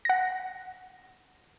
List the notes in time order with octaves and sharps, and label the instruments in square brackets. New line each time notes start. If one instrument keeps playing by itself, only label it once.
[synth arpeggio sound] F#5 A#6